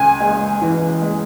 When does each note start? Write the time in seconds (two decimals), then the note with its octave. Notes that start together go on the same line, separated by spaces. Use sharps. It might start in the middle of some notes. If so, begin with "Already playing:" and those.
Already playing: C#2 G#5
0.20 G#3
0.61 E3
1.02 G#3